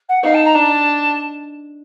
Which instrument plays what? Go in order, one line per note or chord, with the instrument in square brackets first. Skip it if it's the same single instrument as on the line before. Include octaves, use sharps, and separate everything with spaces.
[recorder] F#5
[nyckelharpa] D#4 [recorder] F5
[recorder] A5
A#5
[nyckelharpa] D4 [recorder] A5